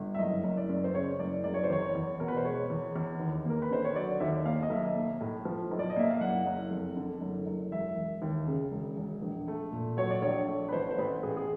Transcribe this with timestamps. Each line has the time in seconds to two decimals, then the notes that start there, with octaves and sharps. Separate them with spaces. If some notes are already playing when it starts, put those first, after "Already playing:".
Already playing: G1
0.15 E5
0.19 F#1 D#5
0.44 F#1
0.57 D5
0.69 F#2
0.84 C5
0.95 C#3 C#5
1.19 F#1 D5
1.44 F#1 D5
1.54 C#5
1.63 C5
1.70 E2 C#5
1.95 E2
2.20 B2 A#4
2.28 B4
2.37 C5
2.45 G#3 C#5
2.70 E2
2.96 E2
3.20 D#2
3.45 A#3 A#4
3.62 B4
3.71 D3 C5
3.85 C#5
3.96 F#3 D5
4.20 D#2 E5
4.45 A#3 F5
4.62 D#5
4.70 B1 E5
4.95 A#3
5.21 A2
5.45 F3
5.71 B1
5.79 D5
5.90 D#5
5.96 A#3 E5
6.10 F5
6.21 F#1 F#5
6.46 F#1
6.71 F2
6.97 D3
7.21 F#1
7.47 F#1
7.72 E1 E5
7.97 E1
8.22 D#2
8.48 C#3
8.72 E1
8.97 E1
9.22 A#1
9.48 A3
9.72 A#2
9.97 F#3 C#5
10.10 D5
10.22 A#1 C#5
10.48 A3
10.69 B4
10.73 A1 C5
10.91 C5
10.98 A1 B4
11.23 A2 G#4
11.37 G#4